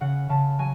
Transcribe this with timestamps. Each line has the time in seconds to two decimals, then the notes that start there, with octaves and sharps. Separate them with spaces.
0.01 C#3 F#5
0.29 C#3 A5
0.59 F#3 G#5